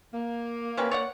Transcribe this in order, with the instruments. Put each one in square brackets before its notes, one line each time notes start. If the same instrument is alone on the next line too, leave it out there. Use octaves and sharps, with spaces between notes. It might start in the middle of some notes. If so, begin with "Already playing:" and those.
[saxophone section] A#3
[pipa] C3 C#4 B4
C#5 D5 F#5